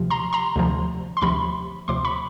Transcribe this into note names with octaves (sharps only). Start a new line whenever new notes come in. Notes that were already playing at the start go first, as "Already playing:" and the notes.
Already playing: D2 C3 F3
A#5 C6
A#5 C6
D2 C3 F3
C6
D2 C3 F3 B5 C#6
D2 C3 F3 C6 D6
B5 C#6